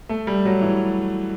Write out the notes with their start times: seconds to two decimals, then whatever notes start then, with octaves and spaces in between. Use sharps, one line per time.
0.09 A3
0.27 G3
0.45 F#3
0.62 E3